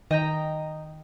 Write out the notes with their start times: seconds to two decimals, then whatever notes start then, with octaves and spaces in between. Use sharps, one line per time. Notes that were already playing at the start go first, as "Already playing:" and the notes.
0.11 D#3 D#5 G5 A#5